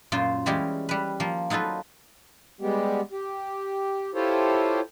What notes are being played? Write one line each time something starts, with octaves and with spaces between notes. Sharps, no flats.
F#2 A#2 F4 C5
E3 G3 G#3 C#4 G4
G3 B4
F3 A#3
F#3 D#4 F4 A4 B4
G3 G#3 B3 G4
G4
E4 F4 G4 A4 C5 C#5